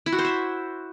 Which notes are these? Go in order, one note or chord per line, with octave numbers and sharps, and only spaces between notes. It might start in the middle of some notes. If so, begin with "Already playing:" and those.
E4
F#4
C5
E5